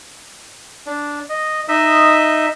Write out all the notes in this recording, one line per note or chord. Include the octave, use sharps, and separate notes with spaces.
D4
D#5
D#4 D#5 E5